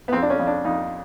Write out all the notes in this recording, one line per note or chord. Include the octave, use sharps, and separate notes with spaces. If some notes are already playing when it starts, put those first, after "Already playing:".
B3
F2 C4
D4
C#4
F2
D4
F2 D#4